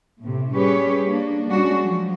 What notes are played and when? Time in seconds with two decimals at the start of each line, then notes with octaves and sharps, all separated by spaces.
0.22 A2 C3
0.53 G3 C#4 G4 G#4 B4 C#5
1.05 A#3 D4
1.47 G3 G#3 C#4 D4 F#4
1.81 F3 F#3